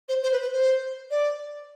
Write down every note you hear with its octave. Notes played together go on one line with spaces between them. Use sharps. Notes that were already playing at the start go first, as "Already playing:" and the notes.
C5
C5
B4
B4
C5
D5